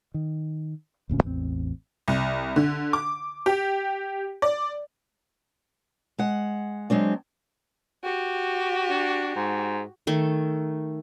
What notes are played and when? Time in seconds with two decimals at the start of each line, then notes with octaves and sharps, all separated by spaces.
0.14 D#3
1.09 E1 D2 A#2 C#4
1.24 A1 E2 A3 C4
2.08 C2
2.56 D3
2.93 D6
3.46 G4
4.42 D5
6.18 G#3 F#5
6.90 F#3 G#3 C4 D4
8.04 F#4 G4
8.90 D4
9.36 G#2
10.07 D#3 A3